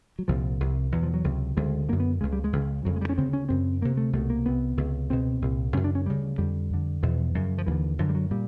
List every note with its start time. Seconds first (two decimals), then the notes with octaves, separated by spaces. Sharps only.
0.19 F#3
0.28 C2 A#2 F3
0.60 C2 C3
0.92 E2 B2 E3
1.03 F3
1.14 F#3
1.24 C#2 C3
1.57 D2 C#3 G#3
1.89 F#2 D3 A#3
2.00 B3
2.21 C#2 C#3 G#3
2.33 G3
2.44 G#3
2.53 C#2 C#3
2.85 F2 C#3 F#3
2.96 G#3
3.01 G3
3.09 C#4
3.18 D2 C#3 C4
3.33 C#4
3.49 F#2 C#3 C4
3.82 D2 C3 A#3
3.97 A3
4.13 C2 B2 A3
4.30 A#3
4.46 C2 C3 B3
4.77 C#2 C3
5.10 C#2 B2 C4
5.42 C2 A#2
5.74 F#2 C#3 C#4
5.84 D4
5.95 C#4
6.06 D2 C#3 G3
6.38 F2 D3 G3
6.70 F2 D3
7.03 E2 B2 F3
7.35 F#2 C#3
7.58 F3
7.66 D#2 D3 E3
7.99 F#2 D3 F3
8.09 G3
8.15 F#3
8.31 A#2 G3